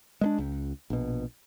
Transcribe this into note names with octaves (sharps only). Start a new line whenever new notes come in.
G#3 A3 D4
C#2
A#1 B2